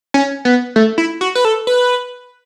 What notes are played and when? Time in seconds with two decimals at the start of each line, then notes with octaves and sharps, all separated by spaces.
0.14 C#4
0.45 B3
0.76 A3
0.98 E4
1.21 F#4
1.35 B4
1.45 A4
1.67 B4